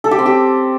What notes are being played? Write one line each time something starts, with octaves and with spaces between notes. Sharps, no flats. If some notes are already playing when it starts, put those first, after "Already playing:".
A4
G4
C4
G4